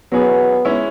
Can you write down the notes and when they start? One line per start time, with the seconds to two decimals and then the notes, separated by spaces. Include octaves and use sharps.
0.12 F#3 B3 C#4 G#4
0.65 G#3 C#4 E4